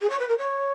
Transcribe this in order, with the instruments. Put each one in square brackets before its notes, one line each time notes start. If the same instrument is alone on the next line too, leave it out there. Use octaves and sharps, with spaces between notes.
[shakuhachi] G#4
C#5
B4
A#4
C#5